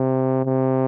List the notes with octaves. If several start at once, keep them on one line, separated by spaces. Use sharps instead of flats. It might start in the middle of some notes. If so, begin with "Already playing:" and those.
Already playing: C3
C3